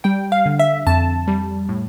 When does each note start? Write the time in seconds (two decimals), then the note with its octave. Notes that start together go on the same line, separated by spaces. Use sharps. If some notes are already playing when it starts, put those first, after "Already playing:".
0.04 G3 G5
0.32 F5
0.46 D3
0.59 E5
0.87 F2 A5
1.28 G3
1.69 A2